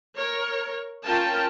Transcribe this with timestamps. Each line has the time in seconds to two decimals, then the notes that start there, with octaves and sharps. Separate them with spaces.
0.15 A#4 C#5
1.04 C#4 F4 A#4 G5 A5